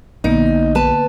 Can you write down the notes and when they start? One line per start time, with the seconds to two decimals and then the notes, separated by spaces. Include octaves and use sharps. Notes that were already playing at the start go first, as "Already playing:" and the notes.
0.24 A#1 D3 A#3 B3 D#4
0.75 B4 A5